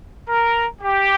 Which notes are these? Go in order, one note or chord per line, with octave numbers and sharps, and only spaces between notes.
A#4
G4